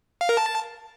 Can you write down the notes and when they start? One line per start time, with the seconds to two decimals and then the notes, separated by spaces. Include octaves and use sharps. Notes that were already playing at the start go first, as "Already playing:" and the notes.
0.21 F5
0.29 A#4
0.37 A5